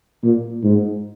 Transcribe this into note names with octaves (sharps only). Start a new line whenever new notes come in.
A#2
G#2